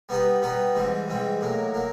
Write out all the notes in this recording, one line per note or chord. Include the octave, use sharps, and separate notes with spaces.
G3 B3 D#4 G4 B4
G3 B3 D#4 G4 B4
G#2 E3 G3 C4
G#2 E3 G3 C4
A2 F#3 A#3
F#3 A#3